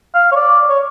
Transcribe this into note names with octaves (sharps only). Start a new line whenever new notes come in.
F5
C#5
D5
C#5